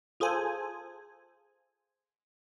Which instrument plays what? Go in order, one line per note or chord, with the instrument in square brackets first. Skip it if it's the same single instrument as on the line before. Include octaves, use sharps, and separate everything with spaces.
[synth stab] F4 G#4 A4 C5 G#5